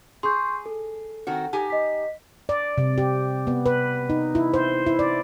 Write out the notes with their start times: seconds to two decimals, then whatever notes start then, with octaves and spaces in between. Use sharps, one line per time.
0.23 G#4 C6 C#6 G6
0.66 A4
1.27 D#3 C4 F#4
1.53 D#4 G4 G#5
1.70 D#5 B6
2.49 D5
2.78 C3
2.98 G4
3.47 B3
3.66 B4
4.10 D#4
4.35 E4
4.54 C5
4.86 E4
4.99 D5